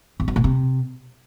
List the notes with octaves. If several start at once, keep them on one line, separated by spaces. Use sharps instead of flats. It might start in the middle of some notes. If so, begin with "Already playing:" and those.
E2
F#2
A#2
C3